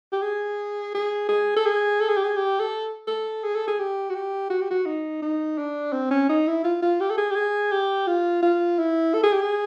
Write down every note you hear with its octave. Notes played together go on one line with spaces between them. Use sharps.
G4
G#4
G#4
G#4
A4
G#4
A4
G#4
G4
G#4
G4
A4
A4
G#4
A4
G#4
G4
F#4
G4
F#4
G4
F#4
D#4
D#4
D4
C4
C#4
D#4
E4
F4
F4
G4
A4
G#4
G4
G#4
G4
F4
F4
E4
A4
G#4
G4
G#4